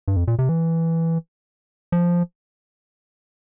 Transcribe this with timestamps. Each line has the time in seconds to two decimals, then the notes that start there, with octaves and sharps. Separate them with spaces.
0.08 G2
0.16 F2
0.28 A#2
0.39 C3
0.49 E3
1.92 F3